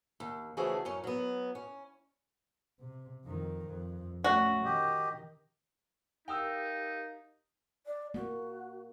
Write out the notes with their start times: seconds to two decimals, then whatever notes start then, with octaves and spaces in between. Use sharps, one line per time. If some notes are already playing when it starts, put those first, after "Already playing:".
0.20 D#2
0.57 C#3 E3 F3 A3 F#4 G#4
0.85 F#2 C#4
1.04 F#3 B3
1.55 C#4
2.80 C3
3.25 F2 D#3
3.66 F2
4.24 A3 C#4 F#4
4.65 D#3 G4 D#5
6.28 D#4 G4 A#4 F5 G5 D#6 E6
7.86 D5
8.14 A#3 F#4